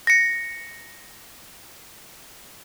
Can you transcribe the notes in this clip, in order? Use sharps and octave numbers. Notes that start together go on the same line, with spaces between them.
A#6 C#7